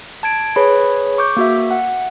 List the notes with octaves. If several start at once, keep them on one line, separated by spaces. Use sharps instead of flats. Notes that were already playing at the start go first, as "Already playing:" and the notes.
A5 G#6 D7
G#4 B4 C#5 B5
C#6 D6 G6
A#3 F#4 E5
F#5